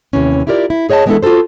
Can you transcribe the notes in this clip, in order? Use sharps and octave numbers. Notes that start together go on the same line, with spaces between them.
D#2 C3 E3 C#4
E4 F4 G4 A#4 D5
E4
G#4 C#5 D#5 G5 A5
E3 G#3 B3 D4 E4 A4
F4 F#4 G#4 A4 C5